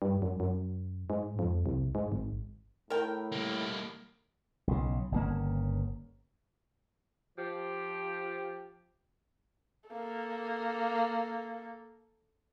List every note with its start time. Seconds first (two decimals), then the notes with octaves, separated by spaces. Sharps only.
0.02 G2
0.22 F#2
0.40 F#2
1.10 G#2
1.39 F2
1.66 C2
1.95 G#2
2.12 G#1
2.90 A2 A#4 G5
3.32 G3 A#3
4.67 B1 C#3
5.12 G1 C#3 A#3
7.38 F3 G4
9.90 A#3 A4